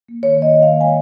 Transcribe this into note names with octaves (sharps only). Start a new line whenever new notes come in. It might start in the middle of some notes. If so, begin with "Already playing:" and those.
A#3
D#3 C#5
A#3 D#5
D#3
A#3 F5
G#3 G#5